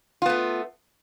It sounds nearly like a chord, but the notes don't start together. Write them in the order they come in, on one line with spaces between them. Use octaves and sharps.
F4 B3 A3